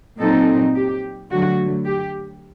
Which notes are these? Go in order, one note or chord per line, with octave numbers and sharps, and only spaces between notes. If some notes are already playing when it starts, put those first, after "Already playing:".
A#2 F#3 C4 D#4 A4
G4
D3 F#3 A3 F#4
G4